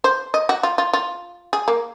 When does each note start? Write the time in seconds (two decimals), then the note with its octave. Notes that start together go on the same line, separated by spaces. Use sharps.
0.04 C5
0.34 D#5
0.49 F#4
0.63 F4
0.78 F4
0.93 F4
1.53 G#4
1.68 A#3